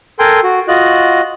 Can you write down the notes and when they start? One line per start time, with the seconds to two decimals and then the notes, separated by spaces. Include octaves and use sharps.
0.19 A4 A#4 G5 G#5 C6
0.43 F#4
0.68 F4 F#4 D#5 F#6